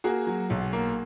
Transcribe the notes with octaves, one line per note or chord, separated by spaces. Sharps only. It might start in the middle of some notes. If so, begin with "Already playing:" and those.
A#3 F#4 G#4
F#3
B1
A#3